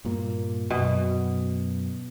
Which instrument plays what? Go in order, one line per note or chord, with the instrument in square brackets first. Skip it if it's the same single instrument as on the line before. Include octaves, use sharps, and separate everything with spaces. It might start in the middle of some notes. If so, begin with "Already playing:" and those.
[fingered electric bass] G2 A#2 A#3
[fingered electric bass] F#2 [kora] B2